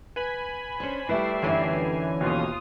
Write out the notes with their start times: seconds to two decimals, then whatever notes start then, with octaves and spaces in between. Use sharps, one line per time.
0.16 B4 G#5 B5
0.80 C#4 D4 C5
1.09 G3 A3 E4 B4 D5 E5 C7
1.42 F#2 D3 E3 C#4 D#4 G#5
2.21 D#2 B2 F4 F5 D#6